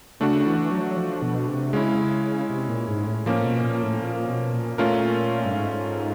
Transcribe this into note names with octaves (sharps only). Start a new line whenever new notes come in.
C#3 A3 D4 F#4
E3
F#3
F3
B2
C3
C#3 G#3 C#4 E4
C3
A#2
G#2
A2
A2 F3 A#3 C#4
B2
A#2
A2
A#2
B2
A#2
A#2 A3 C#4 F4 A#4
G2
G#2